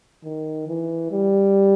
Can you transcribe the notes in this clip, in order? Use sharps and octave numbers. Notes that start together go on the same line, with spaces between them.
D#3
E3
G3